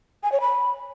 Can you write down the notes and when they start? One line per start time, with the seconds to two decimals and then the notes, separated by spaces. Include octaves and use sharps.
0.23 G#5
0.32 C#5
0.41 B5